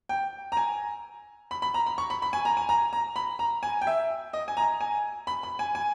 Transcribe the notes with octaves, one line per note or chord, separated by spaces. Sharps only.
G5
A#5
G#5
B5
B5
A#5
B5
C#6
B5
B5
G#5
A#5
G#5
A#5
A#5
B5
A#5
G#5
G5
E5
D#5
G#5
A#5
G#5
B5
B5
G#5
G#5